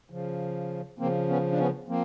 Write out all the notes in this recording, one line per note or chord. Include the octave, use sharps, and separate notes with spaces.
C#3 F3
C#3 F3 A#3 C4
B3 C#4
D4
B3 C#4
F3 A#3 C4